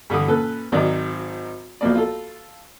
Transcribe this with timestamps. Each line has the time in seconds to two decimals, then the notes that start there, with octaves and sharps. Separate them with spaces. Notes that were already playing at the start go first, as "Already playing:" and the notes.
0.10 G2 D3 E3 D#6
0.28 A#2 C#4 A4 B4
0.72 G#1 D#3 F#3 D5
1.81 B1 F3 A#3 D5
1.95 F4 A4